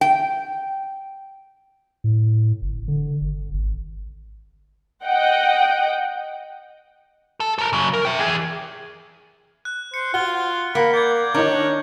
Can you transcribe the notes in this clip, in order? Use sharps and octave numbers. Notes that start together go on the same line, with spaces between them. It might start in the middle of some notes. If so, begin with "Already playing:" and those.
G5
A2
G1
D3
G1
G#1
D#5 F#5 G5
A4
A4 A#4
C#3 F#3
A#4
E5 G5
E3 G#4
F#6
C5 C#7
F4 F#4 F6 G7
A#3 F#5 B5
D5 G6 G#6
D#3 D4 D#4 A#4 C#5